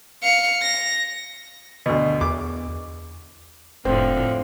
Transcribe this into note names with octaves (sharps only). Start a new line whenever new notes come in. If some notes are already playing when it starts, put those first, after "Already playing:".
F5 C#7
A#6
D2 B2
E2 D6
F1 A2 D3 F3 C4